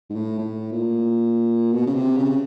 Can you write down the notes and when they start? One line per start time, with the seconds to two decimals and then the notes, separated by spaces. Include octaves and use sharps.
0.10 G#2
0.16 A2
0.38 A2
0.72 A#2
1.72 B2
1.87 C#3
1.95 C3
2.17 C#3